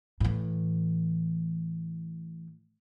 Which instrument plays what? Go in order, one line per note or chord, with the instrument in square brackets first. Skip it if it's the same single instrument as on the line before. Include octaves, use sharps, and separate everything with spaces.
[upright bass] A2 E3